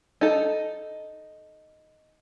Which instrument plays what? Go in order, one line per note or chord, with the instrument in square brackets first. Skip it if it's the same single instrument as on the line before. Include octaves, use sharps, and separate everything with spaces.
[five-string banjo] D#4 A4